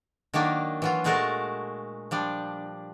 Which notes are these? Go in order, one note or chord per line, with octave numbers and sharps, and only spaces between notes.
D#3 F#3 A#3 D4
E3 F#3 F4
A#2 G#3 A3 F#4 A#4 A5
F3 G3 D4